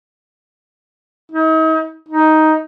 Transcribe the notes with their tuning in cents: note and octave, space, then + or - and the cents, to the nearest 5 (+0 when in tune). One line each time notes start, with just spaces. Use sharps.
D#4 +40
D#4 +5